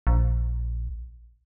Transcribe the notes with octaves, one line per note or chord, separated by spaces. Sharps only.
A#1